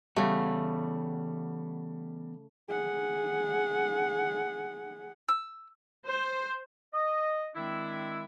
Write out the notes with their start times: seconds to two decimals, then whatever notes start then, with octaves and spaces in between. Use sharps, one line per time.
0.16 C#3 E3 G3 A3 B3 F#5
2.69 G#4 F#5
5.29 E6
6.06 C5
6.94 D#5
7.55 D#3 G#3 C4 D4 E4